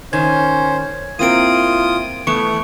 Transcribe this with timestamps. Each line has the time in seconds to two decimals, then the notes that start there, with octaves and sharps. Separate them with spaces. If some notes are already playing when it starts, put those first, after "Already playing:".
0.13 D#3 C#4 C5 G#6
1.19 A#3 C4 E4 F4 A#4 D#6 D7 D#7
2.27 E3 A3 B3 E4 C#6 C#7